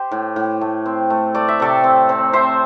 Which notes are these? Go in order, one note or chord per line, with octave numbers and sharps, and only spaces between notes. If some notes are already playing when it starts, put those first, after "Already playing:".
Already playing: G4 C5
A2
A2
A3
C4
A3
A3 D5
E5
C3 A4 D5
C4
C4
C4 C5 E5